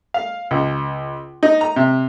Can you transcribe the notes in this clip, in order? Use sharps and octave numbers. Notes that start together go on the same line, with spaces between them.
F5
C#2
D#4
A#5
C3